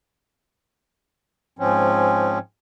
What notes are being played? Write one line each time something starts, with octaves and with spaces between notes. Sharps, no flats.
G#2 F3 C4 C#4